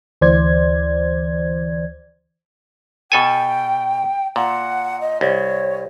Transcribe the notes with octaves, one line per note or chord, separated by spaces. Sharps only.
D2 E3 C5 D5 G#6
B2 A4 G5 G#5
A#2 F#5
D#5
C2 C#5